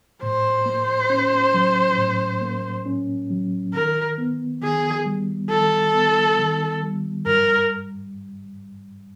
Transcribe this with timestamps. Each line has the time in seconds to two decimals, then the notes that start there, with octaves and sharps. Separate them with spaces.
0.23 A2 C5
0.66 A#3
1.10 C#4
1.54 F#3
1.98 A2
2.42 A#3
2.86 C#4
3.31 F#3
3.74 D#3 A#4
4.18 B3
4.62 D#3 G#4
5.06 G3
5.50 D#3 A4
5.94 B3
6.39 D#3
6.82 G3
7.26 G2 A#4